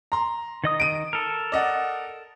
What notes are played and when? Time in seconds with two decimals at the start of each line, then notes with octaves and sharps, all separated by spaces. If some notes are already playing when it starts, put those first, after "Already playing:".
0.12 A#5 C6
0.64 D#3 D#5 D#6
0.80 D7 D#7
1.13 A4 A#4
1.52 D5 D#5 F#5